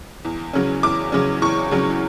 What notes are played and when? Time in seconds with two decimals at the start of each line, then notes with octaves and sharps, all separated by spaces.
0.25 E2
0.53 C#3 F#3 C#4
0.83 E2 D6
1.12 C#3 F#3 C#4
1.42 E2 C#6
1.71 C#3 F#3 C#4